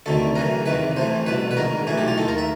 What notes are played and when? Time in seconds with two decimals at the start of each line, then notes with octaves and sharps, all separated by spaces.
0.06 D2 C3 D#3 A4
0.36 F#2 C#3 E3 A#4
0.66 E2 C3 D#3 B4
0.96 A1 A2 E3 C5
1.26 C2 B2 B4
1.51 B4
1.57 A#1 G#2 D#3 A#4
1.87 B1 A2 E3 G#4
1.97 G4
2.08 F4
2.17 D#2 D#3 A4
2.28 A#4
2.38 E5